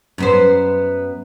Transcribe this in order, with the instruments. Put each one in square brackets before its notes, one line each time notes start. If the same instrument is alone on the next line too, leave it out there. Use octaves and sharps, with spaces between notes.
[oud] F#2 B3 C5